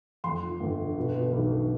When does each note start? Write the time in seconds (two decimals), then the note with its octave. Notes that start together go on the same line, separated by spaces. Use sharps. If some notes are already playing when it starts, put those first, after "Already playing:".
0.24 F2 C6
0.43 F3
0.60 G1
0.79 D3
0.97 B2
1.14 B2
1.33 B1
1.52 B1